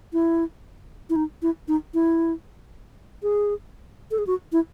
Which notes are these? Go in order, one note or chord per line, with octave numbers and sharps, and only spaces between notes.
E4
E4
D#4
E4
D#4
E4
G#4
A4
G#4
F#4
E4